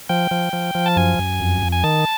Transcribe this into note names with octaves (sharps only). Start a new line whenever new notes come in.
F3 G5
F3
F3
F3
A5
F#2 G#5
F#2
F2
F2
G#5
D#3 A5